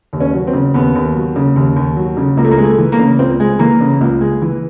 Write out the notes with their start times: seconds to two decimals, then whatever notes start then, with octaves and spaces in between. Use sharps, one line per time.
0.13 D#2
0.20 C#4
0.34 F#3
0.47 C4
0.54 C#3
0.74 D#2 B3
0.95 D#2
1.15 F#3
1.36 C#3
1.56 D#2
1.76 D#2
1.97 F#3
2.17 C#3
2.37 C#2 A#3
2.44 A3
2.51 A#3
2.58 G#3
2.64 A3
2.78 E3
2.92 A#3
2.99 C#3
3.19 C#2 C4
3.40 G#3
3.59 E3 A#3
3.81 C#3
4.01 C#2
4.21 G#3
4.42 E3